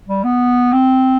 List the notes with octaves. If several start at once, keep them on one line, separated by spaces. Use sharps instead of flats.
G3
B3
C4